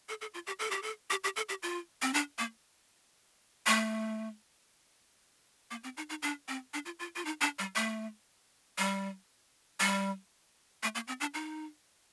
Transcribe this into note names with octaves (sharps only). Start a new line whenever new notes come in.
A4
A4
F4
G4
A4
G4
A4
G4
G4
A4
G4
F4
C4
D4
A#3
A3
A#3
C4
D#4
D#4
D4
C4
D4
F4
F4
F4
D#4
D4
G3
A3
G3
G3
A3
A#3
C4
D4
D#4